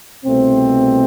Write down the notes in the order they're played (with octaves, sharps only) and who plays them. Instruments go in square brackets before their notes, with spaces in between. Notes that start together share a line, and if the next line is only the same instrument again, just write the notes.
[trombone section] C2 B2 A3 C4